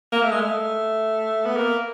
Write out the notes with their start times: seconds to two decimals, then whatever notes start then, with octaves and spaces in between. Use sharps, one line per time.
0.12 A#3
0.22 A3
0.31 G#3
0.41 A3
1.46 B3
1.57 A#3